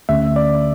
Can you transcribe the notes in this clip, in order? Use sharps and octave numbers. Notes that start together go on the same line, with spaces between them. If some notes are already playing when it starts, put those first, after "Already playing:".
D2 D3 A3 C#4 G4 E5
D5